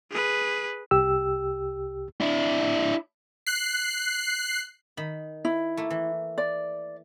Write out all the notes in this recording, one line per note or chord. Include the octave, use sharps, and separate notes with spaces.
G#4 B4
C2 G4 E6
D4 E4
F#6 C7
D#3 B5
E4
A3 A#3
E3
D5